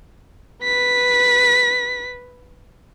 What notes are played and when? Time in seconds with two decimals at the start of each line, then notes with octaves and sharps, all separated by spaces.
0.64 B4 B6